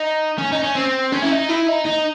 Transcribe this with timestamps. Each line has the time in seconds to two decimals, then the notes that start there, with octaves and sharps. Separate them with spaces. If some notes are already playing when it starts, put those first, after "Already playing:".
Already playing: D#4
0.38 C#4
0.52 D#4
0.63 C#4
0.75 C4
1.12 C#4
1.22 E4
1.31 D#4
1.49 E4
1.68 D#4
1.86 D#4